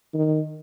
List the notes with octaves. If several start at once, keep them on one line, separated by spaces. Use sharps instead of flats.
D#3